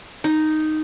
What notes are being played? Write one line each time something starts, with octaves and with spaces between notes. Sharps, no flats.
D#4